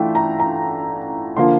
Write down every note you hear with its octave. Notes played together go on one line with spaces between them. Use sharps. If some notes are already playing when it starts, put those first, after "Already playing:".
Already playing: E3 A3 D4 F4 E5 G5
A#5
A#5
D3 F3 A#3 F4 C6